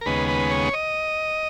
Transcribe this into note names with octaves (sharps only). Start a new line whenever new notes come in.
A#4
D#2 C#3 G#3 B3 B4
B4
C#5
D#5